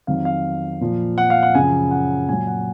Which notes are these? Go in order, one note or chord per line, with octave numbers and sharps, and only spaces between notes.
F2 D#3 F#3 F5
F5
A#2 F3
F#5
F5
F#5
F#2 C#3 F3 G#5
F#5
A#2 F#3 G#5
F#5